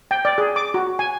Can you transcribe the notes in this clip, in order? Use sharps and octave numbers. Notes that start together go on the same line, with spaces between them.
G5
D5
G#4
D6
F#4
G#5